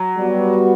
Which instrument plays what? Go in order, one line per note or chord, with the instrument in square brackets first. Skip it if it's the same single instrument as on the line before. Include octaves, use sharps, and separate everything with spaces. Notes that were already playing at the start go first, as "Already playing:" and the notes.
Already playing: [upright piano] F#3
[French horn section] G3 B3 F#4